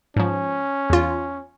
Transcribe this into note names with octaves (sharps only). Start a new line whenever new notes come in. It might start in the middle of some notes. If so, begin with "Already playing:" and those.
G#2 F3 C#4
E2 F4